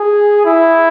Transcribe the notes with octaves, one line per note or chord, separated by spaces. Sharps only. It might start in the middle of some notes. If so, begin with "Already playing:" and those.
Already playing: G#4
E4